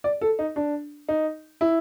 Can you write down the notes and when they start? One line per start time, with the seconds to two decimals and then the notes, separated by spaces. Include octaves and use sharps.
0.04 D5
0.21 A4
0.39 D#4
0.56 D4
1.09 D#4
1.61 E4